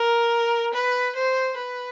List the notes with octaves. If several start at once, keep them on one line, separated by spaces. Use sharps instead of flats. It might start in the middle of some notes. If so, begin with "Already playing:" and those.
Already playing: A#4
B4
C5
B4